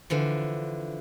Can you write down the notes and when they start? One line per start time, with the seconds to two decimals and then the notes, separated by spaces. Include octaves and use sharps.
0.10 D3 E3 F3